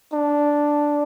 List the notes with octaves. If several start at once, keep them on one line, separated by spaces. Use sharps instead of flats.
D4